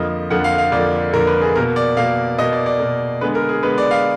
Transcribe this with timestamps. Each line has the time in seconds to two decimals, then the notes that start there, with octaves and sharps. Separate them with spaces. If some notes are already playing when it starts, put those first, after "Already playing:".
Already playing: F2 D3 F3 A#3 D#5
0.30 F2 D3 F3 A#3 F#5
0.44 F5
0.58 F5
0.72 F2 D3 F3 A#3 D5
1.13 F2 D3 F3 A#3 A#4
1.27 B4
1.41 G#4
1.55 B2 A#3 A#4
1.76 D5
1.97 B2 A#3 F5
2.39 B2 A#3 D#5
2.52 D5
2.66 D5
2.80 B2 A#3
3.21 D3 G#3 B3 B4
3.35 A#4
3.49 G#4
3.63 D3 G#3 B3 B4
3.78 D5
3.91 F5